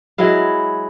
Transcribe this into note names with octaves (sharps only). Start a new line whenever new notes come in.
F#3 G#3 E4 F5